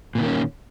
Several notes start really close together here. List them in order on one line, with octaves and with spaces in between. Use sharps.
A#2 B3 D#3 A#3 C#4